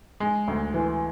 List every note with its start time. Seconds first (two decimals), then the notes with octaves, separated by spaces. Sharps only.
0.20 G#3
0.48 D2
0.74 E3